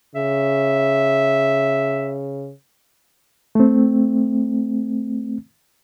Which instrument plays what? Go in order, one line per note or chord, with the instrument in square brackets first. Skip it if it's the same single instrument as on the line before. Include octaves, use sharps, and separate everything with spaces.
[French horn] C#3 [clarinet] E5
[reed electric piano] A3 C4